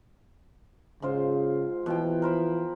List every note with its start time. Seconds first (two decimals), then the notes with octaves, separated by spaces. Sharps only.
1.02 G#2 C#3 F4 C5
1.86 B2 E3 F3 G5
2.22 A#4 C5 B5